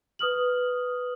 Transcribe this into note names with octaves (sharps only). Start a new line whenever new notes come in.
B4 D#6 F6 F#7